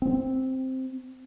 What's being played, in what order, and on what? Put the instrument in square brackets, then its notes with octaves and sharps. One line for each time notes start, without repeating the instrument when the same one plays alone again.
[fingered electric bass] C4